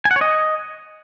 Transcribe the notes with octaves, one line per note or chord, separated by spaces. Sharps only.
G#5
F#5
C#5
D#5